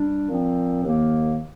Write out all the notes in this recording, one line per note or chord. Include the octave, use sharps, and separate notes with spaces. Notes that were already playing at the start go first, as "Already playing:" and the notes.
Already playing: G3 D4
A#2 F3 C4
D#2 D#3 A#3